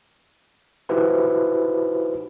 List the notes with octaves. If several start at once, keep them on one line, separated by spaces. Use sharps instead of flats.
D#4 E4 F#4 G4 B4 C5